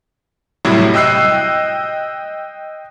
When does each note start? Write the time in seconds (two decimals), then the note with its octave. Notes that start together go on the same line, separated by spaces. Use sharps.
0.65 A2 C3 F#3 G3 E4
0.94 D#5 G5 E6 F#6 C7